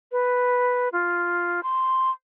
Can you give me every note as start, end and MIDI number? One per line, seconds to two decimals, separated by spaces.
0.12 0.89 71
0.92 1.61 65
1.63 2.10 84